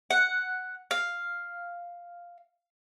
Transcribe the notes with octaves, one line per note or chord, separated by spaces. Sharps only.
F#5
F5